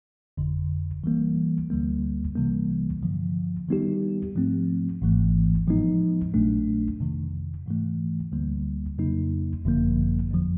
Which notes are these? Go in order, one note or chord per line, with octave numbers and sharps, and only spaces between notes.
G1 F2 D3
E3 G3 A#3
D2 D3 G3 A#3
C2 C3 E3 G3 A#3
G2 D3 F3
D#3 G3 B3 D#4 G4
G#2 F3 A3 C4
G#1 G#2 E3 A3
A2 F3 G#3 B3 D#4
A#1 A#2 F#3 A3 D4
F2 C3 D#3
G#2 E3 A3
D2 D3 G3 A#3
F2 C#3 F#3 A#3 D#4
G#1 F#2 D3 F3 A#3
F2 D3 F3